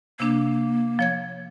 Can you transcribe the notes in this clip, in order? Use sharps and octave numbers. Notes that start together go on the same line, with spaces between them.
C3 A#3 D4
F3 C#5 G#6